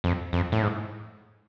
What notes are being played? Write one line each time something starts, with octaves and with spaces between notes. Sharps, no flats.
F2
F2
A2
G#2